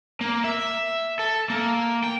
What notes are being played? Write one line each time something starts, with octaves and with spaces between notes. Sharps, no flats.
A#3
E5
A4
A#3
G5